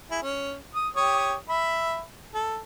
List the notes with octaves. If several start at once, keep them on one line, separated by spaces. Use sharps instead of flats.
E4 G#4
C#4
D#6
G4 C#5 D#6
E5 B5
A4